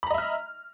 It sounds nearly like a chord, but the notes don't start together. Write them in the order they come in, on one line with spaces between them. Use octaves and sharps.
B5 A#5 D#5 E5 F6